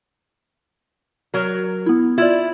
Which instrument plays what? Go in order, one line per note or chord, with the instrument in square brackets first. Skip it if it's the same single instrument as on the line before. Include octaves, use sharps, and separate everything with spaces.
[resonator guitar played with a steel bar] F#3 A#4
[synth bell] B3 E4
[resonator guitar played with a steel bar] E4 [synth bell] F4 D5